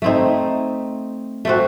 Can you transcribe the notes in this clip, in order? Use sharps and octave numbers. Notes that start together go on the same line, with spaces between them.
A3 C4 D#4
A3 C4 F#4